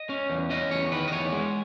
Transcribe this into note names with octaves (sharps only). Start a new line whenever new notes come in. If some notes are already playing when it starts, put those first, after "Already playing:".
Already playing: D#5
C#4
E2
C#4 D#5
E2 C#5
D#3 B4
D#5
E2 C#5
G#3